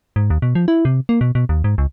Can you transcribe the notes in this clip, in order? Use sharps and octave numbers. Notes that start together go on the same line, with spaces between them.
G#2
D#2
B2
F3
E4
C3
A#3
B2
B2
D#2
G#2
C#2